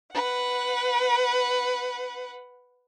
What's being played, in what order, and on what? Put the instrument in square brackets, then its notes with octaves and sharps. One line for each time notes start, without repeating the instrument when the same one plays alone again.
[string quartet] B4 F#5